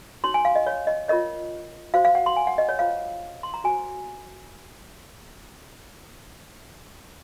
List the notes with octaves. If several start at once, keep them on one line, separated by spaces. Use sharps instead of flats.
D#4 F#4 C#5 C6
G#5
F5
D#5
C#5
D#5
F4 A#4 C#5 D#5
F#4 C5 F5
F5
F#5
C6
G#5
F#5
D#5
C#5
F4 C5 F5
C6
A#5
F#4 C5 G#5